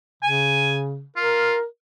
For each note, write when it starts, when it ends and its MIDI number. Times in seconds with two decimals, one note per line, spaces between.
0.23 1.05 49
0.23 0.79 80
1.16 1.55 65
1.16 1.65 70